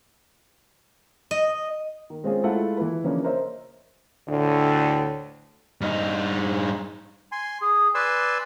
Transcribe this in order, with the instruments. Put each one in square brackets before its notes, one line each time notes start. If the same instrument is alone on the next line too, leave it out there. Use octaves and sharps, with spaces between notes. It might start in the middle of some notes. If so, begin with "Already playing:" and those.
[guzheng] D#5
[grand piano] D#3
G#3 C4 C#4 F4 G#4
G#3 A3 E4 F4 A4 F#5
E3 E4 B4
C#3 E3 F3 A#3 C#4 D4
A#4 C5 C#5 D#5 E5
[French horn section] D2 A2 D3
[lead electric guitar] G2 D#4
[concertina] G#5 C6
G#4
B4 D5 G#5 C6 E6